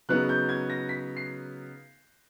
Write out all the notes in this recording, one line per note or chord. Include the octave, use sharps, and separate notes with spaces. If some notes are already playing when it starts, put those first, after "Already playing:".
C#3 F#3 B3 D#4 F#6
G6
G#6
A#6
B6
C7